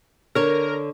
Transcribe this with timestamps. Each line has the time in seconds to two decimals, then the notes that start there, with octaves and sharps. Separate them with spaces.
0.35 D3 A#4 C#5